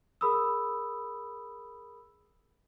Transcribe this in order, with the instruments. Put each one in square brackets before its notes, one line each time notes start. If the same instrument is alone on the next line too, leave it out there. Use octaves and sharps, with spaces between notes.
[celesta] G#4 A#4 B5 D#6 E6